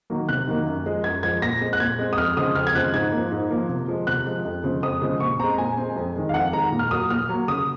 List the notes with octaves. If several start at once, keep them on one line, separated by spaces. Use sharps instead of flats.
D#3 F#3 A#3
C3 F#6
D#3 F#3 A#3
F#2
F3 G#3
F#2 G#6
F3 G#3 G#6
A#2 A#6
G#3 C4
F#6
A#2 G#6
G#3 C4
D#6
F2 F6
C#3 F3 G#3 C4 D#6
F2 F6
G#6
C#3 F3 G#3 C4 F#6
G#2 G#6
F3 A#3
G#2
F3 A#3
C3
F3 G#3
C3 F#6
F3 G#3
F2
C#3 F3 G#3 C4
F2 D#6
C#3 F3 G#3 C4
A#2 C#6
G#3 C4 A#5
A#2 G#5
G#3 C4
F2
D#3 G#3
F5
F2 F#5
D#3 G#3 A#5
A#2
F6
F#3 A#3 D#6
A#2 F6
F#3 A#3
C#3 D#6